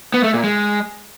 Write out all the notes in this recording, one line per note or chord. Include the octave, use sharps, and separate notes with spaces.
B3
A3
A#2
G#3